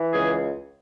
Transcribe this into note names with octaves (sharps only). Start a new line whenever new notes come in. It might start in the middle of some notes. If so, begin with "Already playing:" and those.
Already playing: E3
C#2 G#4